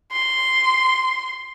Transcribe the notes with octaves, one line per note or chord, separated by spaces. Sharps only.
C6